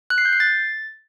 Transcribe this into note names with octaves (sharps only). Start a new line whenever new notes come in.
F#6
C7
G6
C7
A6